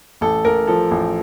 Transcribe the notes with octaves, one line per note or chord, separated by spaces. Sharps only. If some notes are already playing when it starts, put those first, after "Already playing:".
A1 A4
A1 A#4
F3 A4
A1